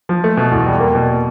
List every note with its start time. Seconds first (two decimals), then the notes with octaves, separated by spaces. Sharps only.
0.09 F3
0.24 A3
0.37 B2
0.52 E2
0.66 G3
0.80 A#3
0.95 B2